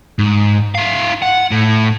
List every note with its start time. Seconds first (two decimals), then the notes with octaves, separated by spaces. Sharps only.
0.19 G#2
0.75 E4 F5
1.22 F#5
1.51 A2